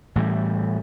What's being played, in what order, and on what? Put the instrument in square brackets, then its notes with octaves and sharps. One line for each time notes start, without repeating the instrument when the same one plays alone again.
[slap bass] A2 E3 G3